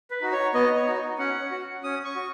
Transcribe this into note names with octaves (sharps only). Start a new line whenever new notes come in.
B4
D#4 F#4
C#5
B3 D#5
C#5
D#4 F#4
C#4 F#5
F#4
C#4 D#6
C#6
F#4